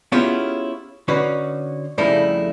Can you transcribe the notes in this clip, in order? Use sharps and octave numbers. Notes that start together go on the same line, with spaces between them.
B3 C#4 E4 F4 G4 G#4
D3 C#4 D#4 F#4 B4
F2 C#3 G3 A3 D#4 E4